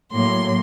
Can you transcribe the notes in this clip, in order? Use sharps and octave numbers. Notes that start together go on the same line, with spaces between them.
A2 F#3 A#3 C6